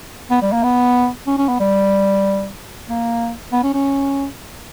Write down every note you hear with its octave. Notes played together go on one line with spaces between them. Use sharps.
B3
G3
A#3
B3
C#4
C#4
B3
G3
A#3
B3
C#4
C#4